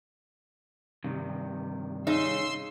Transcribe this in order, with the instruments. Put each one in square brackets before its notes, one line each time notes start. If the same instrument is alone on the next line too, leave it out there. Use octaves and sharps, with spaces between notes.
[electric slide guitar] G2 C3 D#3
[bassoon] C#3 [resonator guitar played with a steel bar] D#4 [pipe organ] C6 E6